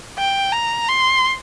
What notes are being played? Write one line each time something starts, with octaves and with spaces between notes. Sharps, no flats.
G5
A#5
C6